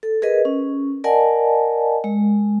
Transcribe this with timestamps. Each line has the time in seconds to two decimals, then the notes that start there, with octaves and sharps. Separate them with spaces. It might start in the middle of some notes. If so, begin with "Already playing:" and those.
0.03 A4
0.22 G#4 A#4 B4 D#5
0.45 C#4
1.04 A#4 D5 D#5 F#5 G#5 A5
2.04 G#3